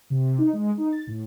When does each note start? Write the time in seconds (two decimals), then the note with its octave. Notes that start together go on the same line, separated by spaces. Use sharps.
0.10 C3
0.38 D#4
0.53 G#3
0.78 D#4
0.92 A6
1.07 A2